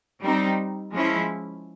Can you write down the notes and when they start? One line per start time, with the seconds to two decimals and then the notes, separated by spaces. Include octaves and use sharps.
0.23 G3 C4 D#4
0.92 F3 G#3 C#4 E4